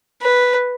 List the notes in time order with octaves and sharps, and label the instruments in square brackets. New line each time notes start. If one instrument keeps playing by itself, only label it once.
[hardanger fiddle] B4